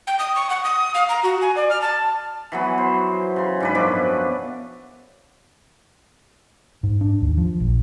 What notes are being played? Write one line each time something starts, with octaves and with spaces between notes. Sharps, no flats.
G5
D#6
C#6
F#5
D#6
F5
A#5
F#4
G#5
D5
F6
A5
E3 F#3 B3
C5
C#3 C6
G#2 D4 B4
F#2 B2 F3 D6
G#2
D4
D#2
F3
A#1